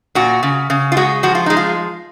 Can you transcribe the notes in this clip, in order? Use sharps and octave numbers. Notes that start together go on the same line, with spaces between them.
A#2 F#4
C#3
C#3
F4
G#3 F#4
F3 F#4
F4
G#3 D#4
F4